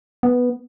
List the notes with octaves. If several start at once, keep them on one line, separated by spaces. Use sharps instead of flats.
B3